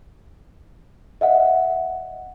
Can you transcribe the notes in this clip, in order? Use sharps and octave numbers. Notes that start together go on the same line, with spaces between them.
D#5 E5 F#5